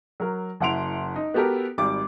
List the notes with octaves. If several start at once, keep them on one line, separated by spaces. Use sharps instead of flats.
F#3 A#4
F#1 E4 F#5 C6 D7 F7
D#4
B3 F#4 G4 A4 A#4
G#1 G3 D6